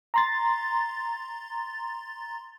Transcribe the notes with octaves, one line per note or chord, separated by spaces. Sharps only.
A#5 C6 A6